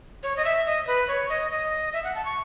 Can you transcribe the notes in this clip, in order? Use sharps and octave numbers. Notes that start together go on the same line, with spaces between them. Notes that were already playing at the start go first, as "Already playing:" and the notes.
C#5
D#5
E5
D#5
B4
C#5
D#5
D#5
E5
F#5
A5
C#6